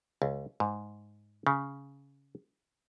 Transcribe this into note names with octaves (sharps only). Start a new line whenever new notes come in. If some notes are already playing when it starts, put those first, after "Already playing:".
C#2
G#2
C#3